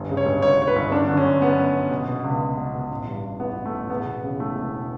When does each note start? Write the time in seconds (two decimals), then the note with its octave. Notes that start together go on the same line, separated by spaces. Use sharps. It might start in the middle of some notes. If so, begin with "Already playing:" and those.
Already playing: G1
0.09 C#3
0.17 C#5
0.26 G1
0.42 G1 C#5
0.58 G1 C#5
0.67 B4
0.76 G1
0.91 F#2 D4
1.08 D3
1.17 C#4
1.24 F#2
1.41 F#2 B3
1.58 F#2
1.74 F#2
1.91 B2
2.08 B2
2.24 C#2
2.41 B2
2.57 B2
2.75 B2
2.90 A1
3.08 G2
3.23 A1
3.40 A1 B3
3.56 A1
3.65 A3
3.74 A1
3.90 E2 B3
4.06 E1
4.23 C#3
4.39 E3 A3
4.56 E1